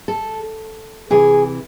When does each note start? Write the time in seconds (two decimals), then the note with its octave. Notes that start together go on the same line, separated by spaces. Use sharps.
0.08 A4
1.10 C3 E3 G#4